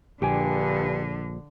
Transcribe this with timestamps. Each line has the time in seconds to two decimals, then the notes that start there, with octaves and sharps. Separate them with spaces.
0.22 A#1 G2 D3 G4 G5 G#5